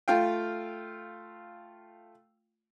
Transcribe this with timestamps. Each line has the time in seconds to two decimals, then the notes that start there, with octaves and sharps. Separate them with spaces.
0.08 A3 F4 F5 G5